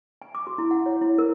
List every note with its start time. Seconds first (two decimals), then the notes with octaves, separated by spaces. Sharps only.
0.22 G#5
0.35 D6
0.47 F#4
0.58 E4
0.71 F#5
0.86 C#5
1.01 E4
1.18 A#4